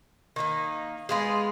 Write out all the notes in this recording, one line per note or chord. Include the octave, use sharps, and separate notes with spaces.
D#3 A#3 D#4
G#3 B3 F4 G#4